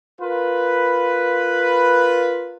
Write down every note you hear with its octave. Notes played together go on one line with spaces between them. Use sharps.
F4 A#4 B4